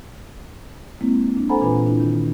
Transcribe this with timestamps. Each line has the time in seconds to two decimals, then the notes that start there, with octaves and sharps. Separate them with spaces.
1.01 G#3 A#3 C4 E4
1.37 D4
1.49 A4 C5 F#5 G#5 A#5 B5
1.61 A#2 E3 D4 F4 B4 B5
1.85 C4 D4 E4
2.00 D#3